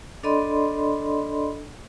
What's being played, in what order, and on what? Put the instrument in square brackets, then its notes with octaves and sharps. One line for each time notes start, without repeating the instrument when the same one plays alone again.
[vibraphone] D4 A4 D5 D#5 B5 C6